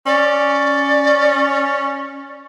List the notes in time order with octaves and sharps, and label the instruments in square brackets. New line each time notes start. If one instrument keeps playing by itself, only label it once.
[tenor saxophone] C#4 [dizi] D5